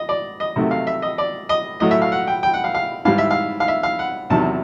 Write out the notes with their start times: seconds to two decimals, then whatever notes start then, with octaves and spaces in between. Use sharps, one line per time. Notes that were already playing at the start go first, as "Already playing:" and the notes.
Already playing: D#5
0.09 D5
0.40 D#5
0.56 C3 D#3 F#3 A3
0.71 F5
0.87 E5
1.02 D#5
1.18 D5
1.49 D#5
1.80 A2 F#3 A3 D#5
1.91 E5
2.02 F5
2.12 F#5
2.27 G5
2.43 G5
2.54 F#5
2.64 F5
2.74 F5
3.05 G#2 E3 G3 F5
3.18 E5
3.30 F5
3.60 F5
3.68 E5
3.83 F5
3.99 F#5
4.30 E2 C3 D#3 F#3 A5